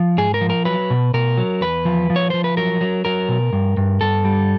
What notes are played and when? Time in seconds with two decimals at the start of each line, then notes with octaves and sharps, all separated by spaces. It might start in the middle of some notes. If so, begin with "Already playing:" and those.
Already playing: F3
0.18 G#2 G#4
0.34 A#4
0.41 F3
0.50 A#4
0.65 F#3 B4
0.90 B2
1.14 B2 A#4
1.37 F#3
1.61 E2 B4
1.85 F3
2.10 F3
2.16 C#5
2.30 F3 C5
2.44 B4
2.57 F#3 A#4
2.81 F#3
3.05 F#3 A#4
3.29 B2
3.53 G2
3.77 G2
4.01 G2 A4
4.25 G3